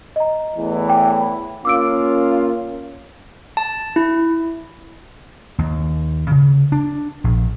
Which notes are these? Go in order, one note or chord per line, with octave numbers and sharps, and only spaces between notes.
D#5 A#5
E2 A2 E3
G5 D6
B5
A#3 C#4 F4 D6 E6 D7
A5
E4
D#2
C#3
D4
A#1